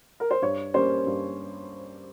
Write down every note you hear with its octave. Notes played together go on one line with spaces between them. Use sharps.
A#4
C5
G2 C#5
G3 A#3 C#4 C5
G2